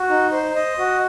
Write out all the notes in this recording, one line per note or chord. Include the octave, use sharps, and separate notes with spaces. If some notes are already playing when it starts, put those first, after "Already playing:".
Already playing: F#4
D#4
C5
D#5
F#4